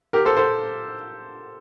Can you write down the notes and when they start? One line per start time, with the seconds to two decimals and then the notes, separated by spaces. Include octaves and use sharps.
0.13 G4 A#4
0.25 A4 C5
0.37 A4 C5